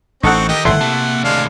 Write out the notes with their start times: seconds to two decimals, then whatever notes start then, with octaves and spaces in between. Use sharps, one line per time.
0.23 A1 C4 D#4 A4 F#5 C#6
0.49 D#3 G4 D#5
0.65 G1 C2 E3 A3 E4 F#5 C6
0.81 C3 A#3 A5
1.24 D#2 A2 G#3 D4 F5